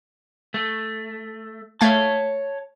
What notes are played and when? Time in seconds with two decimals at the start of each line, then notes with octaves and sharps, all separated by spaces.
0.54 A3
1.81 A3 C#5 F5 A5 G#6